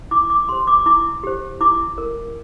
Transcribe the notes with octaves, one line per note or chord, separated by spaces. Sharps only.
E4 D6
D6
G4 C5 C6
D6
E4 D6
G4 C5
E4 D6
A#4